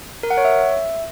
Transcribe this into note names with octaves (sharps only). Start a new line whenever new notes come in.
A#4
F#5
C#5
E5